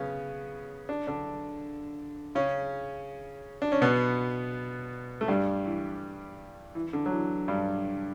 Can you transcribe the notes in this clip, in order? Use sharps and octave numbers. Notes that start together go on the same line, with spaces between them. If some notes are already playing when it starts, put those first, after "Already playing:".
Already playing: C#3 B3 C#4
D4
D3 D4
C#3 C#4
D4
C#4
B2 B3
A3
G2 G3
E3
E3
D3
F#3
E3
G2 G3